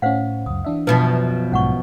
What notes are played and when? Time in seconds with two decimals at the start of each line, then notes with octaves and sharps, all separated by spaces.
0.02 A2 C#4 C5 F5 F#5
0.46 C#2 F#2 D#6
0.65 E3 D4 E5
0.87 F#2 B2 F3 B4
1.52 B1 G#2 C#4 F#5 C#6